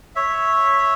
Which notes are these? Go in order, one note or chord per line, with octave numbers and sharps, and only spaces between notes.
C#5 E5